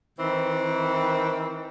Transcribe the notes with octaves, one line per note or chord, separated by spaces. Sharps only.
D#3 E3 C4